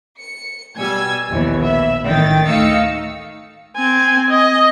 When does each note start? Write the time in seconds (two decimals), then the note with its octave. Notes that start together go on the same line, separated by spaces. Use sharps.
0.18 C#7
0.79 B2 G3 G#5 E6 G#6
1.30 A#1 D#2 B2 E3
1.62 E5 B5
2.05 A1 D#3 G5 A6
2.46 D2 A3 D#4 F5 E6 C#7
3.77 C4 G#5
4.31 D#5